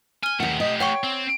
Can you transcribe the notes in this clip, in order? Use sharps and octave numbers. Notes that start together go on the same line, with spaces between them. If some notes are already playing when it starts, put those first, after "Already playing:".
G#5 F6 G7
D#2 A3 G4 F#5
D#5
C#5 F#5 G5 C#6
C4